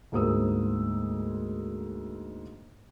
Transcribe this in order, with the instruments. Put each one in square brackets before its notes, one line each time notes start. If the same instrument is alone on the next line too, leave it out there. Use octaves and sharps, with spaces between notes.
[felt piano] D2 G#2 A#3 C5 D#6 E6